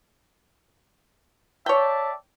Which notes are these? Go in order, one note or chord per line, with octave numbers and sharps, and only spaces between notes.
C#5 D5 E5 G5 A5